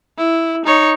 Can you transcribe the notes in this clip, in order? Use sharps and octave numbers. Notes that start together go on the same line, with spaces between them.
E4
D#4 C#5